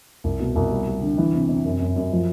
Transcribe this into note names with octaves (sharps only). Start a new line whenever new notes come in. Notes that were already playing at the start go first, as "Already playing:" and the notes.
C2
B2
C2
G3
G3
D3
E3
C3
C3
F#2
F#2
F#2
F3